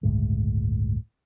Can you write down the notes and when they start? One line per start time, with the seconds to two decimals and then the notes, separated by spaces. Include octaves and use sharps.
0.03 G1 C#2 A2 G#3